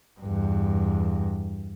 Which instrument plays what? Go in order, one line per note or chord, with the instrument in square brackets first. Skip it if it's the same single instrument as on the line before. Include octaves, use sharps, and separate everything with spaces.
[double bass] E2 G2